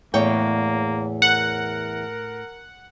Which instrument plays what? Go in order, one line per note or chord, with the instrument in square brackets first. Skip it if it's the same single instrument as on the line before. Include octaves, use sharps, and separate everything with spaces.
[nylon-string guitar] E2 C#5 G5 [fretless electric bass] A2 [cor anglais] A#3
[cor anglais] A#4 [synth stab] F#5